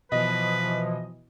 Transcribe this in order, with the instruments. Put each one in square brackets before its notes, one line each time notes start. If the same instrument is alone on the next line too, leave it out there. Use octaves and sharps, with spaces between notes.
[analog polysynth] B2 E3 [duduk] F3 [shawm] B4 [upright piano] D#5